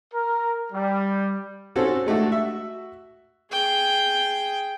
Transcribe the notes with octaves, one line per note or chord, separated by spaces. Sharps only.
A#4
G3
G#2 C4 C#4 F#4 A4
G#3 A3 D4 F#4
F#4 E5
G#4 G5